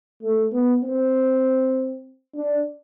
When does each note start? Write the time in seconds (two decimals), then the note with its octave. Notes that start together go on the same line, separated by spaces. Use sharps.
0.23 A3
0.53 B3
0.84 C4
2.35 D4